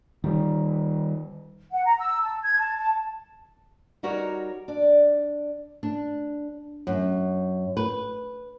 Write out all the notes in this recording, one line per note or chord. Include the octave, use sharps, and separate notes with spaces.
D#3 G3
F#5
A#5
E6
A5
G#6
A5
A5
G3 D#4 F#4 A#4 C#5
D4 D5
D4
F#2
B4